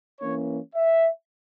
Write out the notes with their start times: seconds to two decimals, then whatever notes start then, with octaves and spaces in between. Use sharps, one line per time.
0.21 E3 A#3 C#4 C#5
0.75 E5